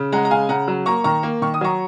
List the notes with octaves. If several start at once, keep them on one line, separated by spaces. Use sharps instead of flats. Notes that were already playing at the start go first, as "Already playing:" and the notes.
Already playing: C#3
G#3 F#5 A#5
A#5
C#3 F5 G#5
C#3 F#5 A#5
F#3
A#3 A#5 C#6
D#3 A#5 C#6
A#3
D#3 C#6
D#6
F#3 A#5 C#6